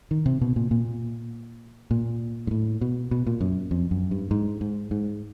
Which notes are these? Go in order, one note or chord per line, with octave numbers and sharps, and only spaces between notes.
D#3
C3
B2
A#2
A#2
A#2
G#2
A2
B2
B2
A#2
F#2
F2
F#2
G2
G#2
G#2
G#2